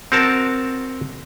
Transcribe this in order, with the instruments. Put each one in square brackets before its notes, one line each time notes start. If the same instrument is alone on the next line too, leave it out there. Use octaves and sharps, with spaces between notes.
[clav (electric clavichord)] C4 F#4 A#4 A5